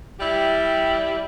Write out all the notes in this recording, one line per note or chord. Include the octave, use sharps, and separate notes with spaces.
G3 E4 G4